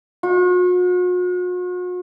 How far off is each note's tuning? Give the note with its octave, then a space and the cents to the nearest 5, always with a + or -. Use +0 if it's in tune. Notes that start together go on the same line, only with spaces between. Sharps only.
F#4 -45